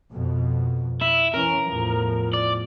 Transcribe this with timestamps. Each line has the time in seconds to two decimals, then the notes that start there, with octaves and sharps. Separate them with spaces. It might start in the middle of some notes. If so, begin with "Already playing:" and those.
0.10 F2 B2
1.01 E4
1.34 E3 C#4 A#4
1.67 E2 A2 F3
2.33 D5